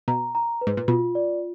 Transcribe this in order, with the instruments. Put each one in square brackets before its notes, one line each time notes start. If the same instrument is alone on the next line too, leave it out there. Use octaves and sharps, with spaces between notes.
[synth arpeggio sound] B2 [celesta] A#5
[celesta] A#5
B4
[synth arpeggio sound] G#2
A#2
[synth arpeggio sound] B2 [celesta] F4
[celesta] D5